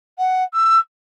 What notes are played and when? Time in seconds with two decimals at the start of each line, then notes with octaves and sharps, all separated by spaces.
0.18 F#5
0.54 E6